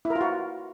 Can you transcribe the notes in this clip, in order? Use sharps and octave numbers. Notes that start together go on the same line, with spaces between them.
E4
A#4
F4
F#4